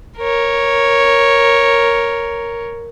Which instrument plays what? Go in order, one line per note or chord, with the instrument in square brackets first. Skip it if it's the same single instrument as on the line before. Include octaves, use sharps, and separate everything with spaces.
[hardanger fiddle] A#4 C#5